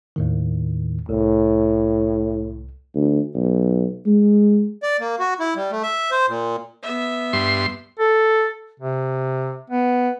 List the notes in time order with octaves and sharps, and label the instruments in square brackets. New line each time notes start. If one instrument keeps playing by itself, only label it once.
[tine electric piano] D#2 A2 D#3
[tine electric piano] C2 [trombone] A2
[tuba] D2
B1
G#3
[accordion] D5
A#3
F#4
E4
G3
A3
E5
C5
A#2
[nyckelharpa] B3 E5
[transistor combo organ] G2 C6
[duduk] A4
C3
B3